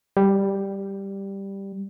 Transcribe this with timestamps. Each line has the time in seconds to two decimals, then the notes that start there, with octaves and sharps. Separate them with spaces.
0.17 G3